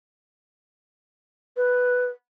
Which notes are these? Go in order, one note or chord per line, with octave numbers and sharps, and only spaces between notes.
B4